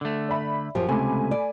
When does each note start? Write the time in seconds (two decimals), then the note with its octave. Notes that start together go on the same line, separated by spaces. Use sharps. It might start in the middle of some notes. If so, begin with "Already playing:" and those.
0.01 D3 A3
0.29 D5 E5 B5
0.75 F#2 F3 G4 C5
0.89 C#2 C3 A3 G#5 B5 D6
1.31 D5